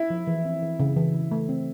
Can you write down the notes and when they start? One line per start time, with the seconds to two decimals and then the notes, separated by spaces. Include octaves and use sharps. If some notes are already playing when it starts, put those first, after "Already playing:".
Already playing: E4
0.10 F3
0.27 E3
0.45 C4
0.62 E3
0.80 C#3
0.97 E3
1.14 C#3
1.31 A3
1.49 C4